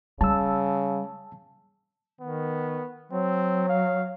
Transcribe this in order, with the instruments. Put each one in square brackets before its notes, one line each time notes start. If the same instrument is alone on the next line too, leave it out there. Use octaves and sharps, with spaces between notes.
[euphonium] C#3 [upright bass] G3 [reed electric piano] A5 E6
[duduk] D#3 [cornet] B3
[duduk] F#3 [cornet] C4
[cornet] F5